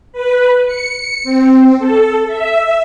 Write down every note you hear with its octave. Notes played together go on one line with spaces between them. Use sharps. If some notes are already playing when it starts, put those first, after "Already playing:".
B4
C#7
C4
A4
E5